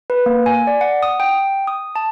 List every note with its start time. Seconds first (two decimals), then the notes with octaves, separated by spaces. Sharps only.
0.10 B4
0.26 A#3
0.46 G#5
0.67 D5
0.81 F#5
1.03 D#6
1.20 G5
1.67 D#6
1.96 A5